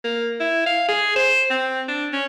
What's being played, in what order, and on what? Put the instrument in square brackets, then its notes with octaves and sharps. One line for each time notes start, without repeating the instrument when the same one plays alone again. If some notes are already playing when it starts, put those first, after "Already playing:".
[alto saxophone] A#3
E4
F5
G#4
C5
C4
D4
C#4